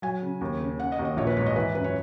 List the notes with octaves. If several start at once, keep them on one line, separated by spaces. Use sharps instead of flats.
F#3 G#5
C#3
D#2
C#3
C#3 F#5
D#5
D#2
D#5
A#1 C#5
B4
G#2 C#5
D#5
E3 B4
F#2 B4
C#5